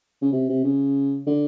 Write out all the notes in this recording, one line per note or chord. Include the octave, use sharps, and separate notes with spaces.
C#3
C3
C3
C#3
D3